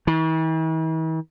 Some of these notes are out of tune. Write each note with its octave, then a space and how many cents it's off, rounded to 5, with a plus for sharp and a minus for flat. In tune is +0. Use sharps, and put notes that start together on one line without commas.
E3 -45